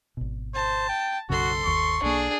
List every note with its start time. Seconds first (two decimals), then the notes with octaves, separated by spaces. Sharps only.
0.17 G#1 B2
0.55 C5 A5
0.89 G5
1.30 B1 F#2 C#3 F#4 A4 C6
1.65 G1 D#2 C#6
2.03 B1 A#3 D4 G#4